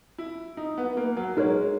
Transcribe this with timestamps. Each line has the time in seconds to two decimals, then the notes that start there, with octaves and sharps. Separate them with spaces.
0.18 E4
0.57 D#4
0.78 B3
0.97 A#3
1.17 F#3
1.37 G#3 D#4 A#4 C#5